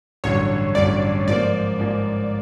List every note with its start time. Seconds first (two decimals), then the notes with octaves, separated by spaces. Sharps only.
0.24 A1 G2 D3 F#3 C#5
0.75 A1 G2 D3 F#3 D5
1.27 G#2 F3 A#3 D5
1.79 G#2 F3 A#3